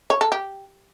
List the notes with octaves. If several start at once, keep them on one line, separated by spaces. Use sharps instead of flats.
C#5
A4
G4